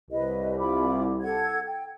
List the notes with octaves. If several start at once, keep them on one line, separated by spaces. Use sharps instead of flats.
C2 B4 D#5
F4 B5 D6
A4 F#5 G#6
G5